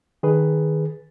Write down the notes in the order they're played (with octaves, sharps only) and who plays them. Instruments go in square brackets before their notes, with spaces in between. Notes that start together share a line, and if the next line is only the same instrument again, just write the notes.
[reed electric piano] D#3 G#4 B4